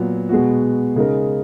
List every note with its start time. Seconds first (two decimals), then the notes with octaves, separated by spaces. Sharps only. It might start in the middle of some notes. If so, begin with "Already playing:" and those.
Already playing: A#2 F#3 B3
0.29 B2 G#3 B3 F#4
0.96 C#3 G#3 D#4 A#4